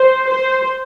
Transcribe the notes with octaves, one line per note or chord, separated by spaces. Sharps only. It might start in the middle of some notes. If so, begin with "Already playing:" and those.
Already playing: C5
C5